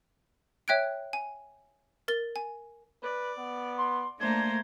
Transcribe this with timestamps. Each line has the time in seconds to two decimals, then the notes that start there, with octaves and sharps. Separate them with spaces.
0.68 C#5 E5 G5 F#6 G#6 D7
1.13 G#5
2.08 A#4 A6 G7
2.36 G#5
3.03 B4 D5
3.38 B3
3.78 C6
4.20 A3 A#3 D4 C5 A#5 G#6